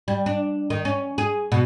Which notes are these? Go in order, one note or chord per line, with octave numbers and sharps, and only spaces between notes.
G3
D4
D#3
C#4
G#4
B2